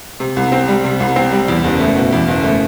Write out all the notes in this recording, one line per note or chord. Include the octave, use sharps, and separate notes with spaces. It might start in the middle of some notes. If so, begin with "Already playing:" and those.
C3
C2
C4
G3
C3
C2
C4
G3
E2
F#1
A3
B2
E2
F#1
A3